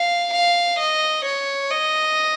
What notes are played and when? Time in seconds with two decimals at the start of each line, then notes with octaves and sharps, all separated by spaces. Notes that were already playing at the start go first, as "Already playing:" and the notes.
Already playing: F5
0.34 F5
0.79 D#5
1.25 C#5
1.70 D#5